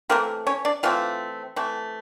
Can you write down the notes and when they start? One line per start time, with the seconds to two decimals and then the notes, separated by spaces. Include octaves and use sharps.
0.09 E3 A3 A#3 C4 A#4
0.47 C#4 C#5
0.65 D4 D5
0.83 E3 A3 C4 F4 F5
1.56 E3 A3 C4